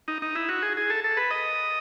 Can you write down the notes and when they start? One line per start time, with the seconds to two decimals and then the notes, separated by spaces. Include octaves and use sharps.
0.08 D#4
0.22 D#4
0.35 E4
0.49 F#4
0.62 G#4
0.77 G#4
0.90 A4
1.04 A4
1.17 B4
1.31 D#5